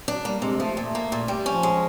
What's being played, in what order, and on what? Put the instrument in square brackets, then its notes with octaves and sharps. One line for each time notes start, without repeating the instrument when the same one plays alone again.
[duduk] F#3 [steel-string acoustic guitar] D4
[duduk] G3 [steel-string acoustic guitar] A#3
[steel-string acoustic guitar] C3 [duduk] G#3
[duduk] G#3
[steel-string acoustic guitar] F3 [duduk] A3
[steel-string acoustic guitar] A#2 [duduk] A3
[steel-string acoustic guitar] A#3
A#2
G3
[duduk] F3 [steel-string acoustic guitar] C#4
[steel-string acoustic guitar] G#3